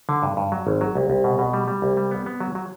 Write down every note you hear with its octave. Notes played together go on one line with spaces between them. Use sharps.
D3
G2
G2
F#3
G#1
F#3
C2
C2
B2
B2
G3
G3
C2
G3
B3
B3
F#3
F#3